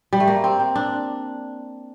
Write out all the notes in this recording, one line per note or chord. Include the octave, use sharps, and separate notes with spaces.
G3
A3
A#3
C4
C4
D4